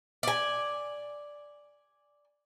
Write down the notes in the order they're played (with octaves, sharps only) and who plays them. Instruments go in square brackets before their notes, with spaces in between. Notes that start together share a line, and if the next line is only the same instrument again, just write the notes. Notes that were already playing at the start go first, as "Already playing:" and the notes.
[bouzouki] D5 G#5